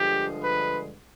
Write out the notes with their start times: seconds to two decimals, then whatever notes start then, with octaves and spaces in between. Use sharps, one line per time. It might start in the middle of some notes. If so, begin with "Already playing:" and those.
Already playing: G2 D3 F3 G#3 G4
0.41 B4